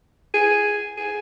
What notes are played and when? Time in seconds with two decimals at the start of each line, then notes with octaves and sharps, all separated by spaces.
0.34 G#4
0.98 G#4